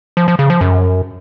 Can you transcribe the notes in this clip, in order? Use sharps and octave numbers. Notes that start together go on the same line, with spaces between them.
F3
F3
C#3
F3
F#2